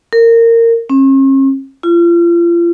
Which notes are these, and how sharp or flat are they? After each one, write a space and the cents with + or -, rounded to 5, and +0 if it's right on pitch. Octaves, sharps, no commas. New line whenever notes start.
A#4 -20
C#4 -45
F4 -35